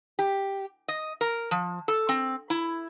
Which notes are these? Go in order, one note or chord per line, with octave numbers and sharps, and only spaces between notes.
G4
D#5
A#4
F3
A4
C4
E4